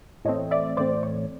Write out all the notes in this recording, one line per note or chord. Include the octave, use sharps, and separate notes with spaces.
A2 E3 A3 C4 C#5 D#5
D5 E5
A2 E3 A3 C4 C5 D5
C#5